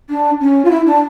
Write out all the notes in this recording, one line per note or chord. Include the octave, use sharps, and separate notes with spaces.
D4
C#4
F4
E4
D4